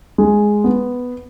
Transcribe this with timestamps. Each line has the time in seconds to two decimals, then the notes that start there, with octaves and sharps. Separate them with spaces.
0.18 G#3
0.64 B3